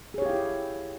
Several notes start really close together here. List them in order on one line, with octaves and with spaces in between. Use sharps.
G#4 C#5 G4 F5 E4